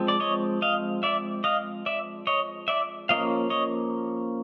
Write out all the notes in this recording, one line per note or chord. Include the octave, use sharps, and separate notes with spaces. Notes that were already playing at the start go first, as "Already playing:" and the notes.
Already playing: F3 G#3 C4
D5
C#5 D#5
D#5 F5
D5 E5
D#5 F5
D5 E5
C#5 D#5
D5 E5
F3 A#3 C#4 D#5 F5
C#5 D#5